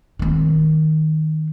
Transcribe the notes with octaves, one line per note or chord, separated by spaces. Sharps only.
D#3 C4